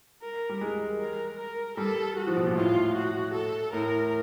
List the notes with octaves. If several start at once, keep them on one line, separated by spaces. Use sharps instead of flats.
A#4
G3
G#3
A#4
A#4
G3 A4
F#4
F3
B2
A#2
A2 F4
F#4
A4
A2 A#4